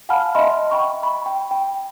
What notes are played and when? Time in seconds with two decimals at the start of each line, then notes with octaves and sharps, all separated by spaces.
0.09 F5 F#5 G#5 A5 B5 F6
0.35 D#5 E5 B5 C6
0.71 G5 B5 C#6
1.03 B5
1.26 G5
1.51 G5